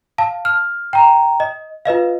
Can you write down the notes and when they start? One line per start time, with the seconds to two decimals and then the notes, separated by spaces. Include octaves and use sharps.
0.18 F5 A5
0.45 F6
0.93 G5 A#5
1.40 D#5
1.85 F4 B4 D#5 F5